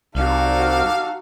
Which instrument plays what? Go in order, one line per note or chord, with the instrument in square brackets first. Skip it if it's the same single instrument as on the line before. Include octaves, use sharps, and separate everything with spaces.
[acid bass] C2 [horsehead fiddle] D#4 F#4 [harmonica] G4 A4 F5